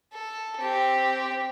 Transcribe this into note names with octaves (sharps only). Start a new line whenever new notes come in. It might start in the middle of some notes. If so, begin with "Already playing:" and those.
A4
C4 G4